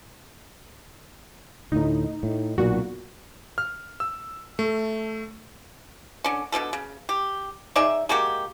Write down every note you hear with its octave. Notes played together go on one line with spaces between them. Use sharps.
D2 A2 D#4
A2
B1 A#2 F#4
F6
E6
A3
D3 C#4
B2 D3 F3 A4
C#3
G4
D#4 G#4 D5 E5
G#3 A#3 F#4 G4